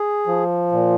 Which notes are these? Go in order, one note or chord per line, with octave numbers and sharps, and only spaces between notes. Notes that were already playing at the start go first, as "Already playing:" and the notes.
Already playing: G#4
F3
A#2